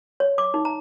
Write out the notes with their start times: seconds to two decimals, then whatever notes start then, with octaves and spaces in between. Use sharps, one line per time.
0.20 C#5
0.38 D6
0.54 D#4
0.65 A#5